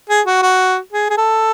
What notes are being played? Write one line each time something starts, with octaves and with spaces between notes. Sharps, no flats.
G#4
F#4
F#4
G#4
G#4
A4